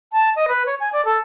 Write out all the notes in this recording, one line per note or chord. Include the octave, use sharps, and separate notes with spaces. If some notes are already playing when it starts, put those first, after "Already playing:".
A5
D#5
B4
C#5
G#5
D5
A4